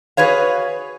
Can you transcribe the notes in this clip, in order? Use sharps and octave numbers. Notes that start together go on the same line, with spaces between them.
F#4 G#4 B4 C#5 F5